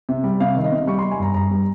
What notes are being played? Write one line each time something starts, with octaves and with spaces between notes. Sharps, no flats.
C3
G3
C3 F5
D#3
D#5
C3
G3 C#6
C6
G3
G#5
G2 A#5
G2 A#5
G3